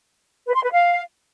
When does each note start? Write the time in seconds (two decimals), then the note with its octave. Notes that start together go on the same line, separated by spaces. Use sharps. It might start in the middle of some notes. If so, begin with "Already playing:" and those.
0.47 B4
0.55 C6
0.64 B4
0.72 F5